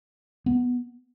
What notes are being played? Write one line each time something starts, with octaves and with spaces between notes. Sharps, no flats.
B3